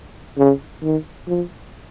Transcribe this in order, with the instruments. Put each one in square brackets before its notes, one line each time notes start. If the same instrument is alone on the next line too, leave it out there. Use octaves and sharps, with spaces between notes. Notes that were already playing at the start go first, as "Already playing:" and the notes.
[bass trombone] C#3
D#3
F3